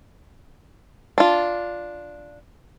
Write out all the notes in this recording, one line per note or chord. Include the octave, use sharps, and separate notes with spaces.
D4 F4